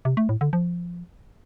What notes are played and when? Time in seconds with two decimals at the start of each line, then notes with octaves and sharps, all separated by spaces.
0.05 C3
0.17 A3
0.29 A2
0.41 D3
0.53 F3